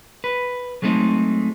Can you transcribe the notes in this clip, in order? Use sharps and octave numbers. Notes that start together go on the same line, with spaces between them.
B4
F#3 G#3 A3 C4 D#4